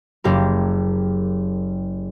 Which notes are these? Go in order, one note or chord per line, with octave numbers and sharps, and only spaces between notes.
F#1 G4 A#4